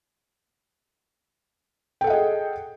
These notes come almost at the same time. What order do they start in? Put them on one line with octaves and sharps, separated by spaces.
G5 A4 F#5 D#5 G#4